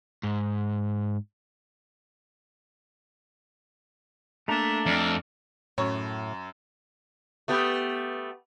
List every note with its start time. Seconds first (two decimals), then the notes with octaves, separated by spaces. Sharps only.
0.23 G#2
4.48 A3 A#3 D4 E5 A#5
4.86 F2 D5 F6
5.78 F#2 A2 C#5
7.48 A3 B3 G4